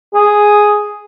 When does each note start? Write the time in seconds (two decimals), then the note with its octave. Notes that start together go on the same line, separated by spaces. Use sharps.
0.14 G#4